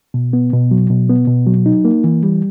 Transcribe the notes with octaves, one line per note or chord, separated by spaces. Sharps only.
B2
B3
B2
F#3
B2
B3
B2
F#3
D#4
A#3
E3
G3